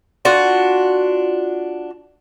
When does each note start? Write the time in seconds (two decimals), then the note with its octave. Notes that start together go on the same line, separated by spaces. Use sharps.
0.25 D4 F4 F#4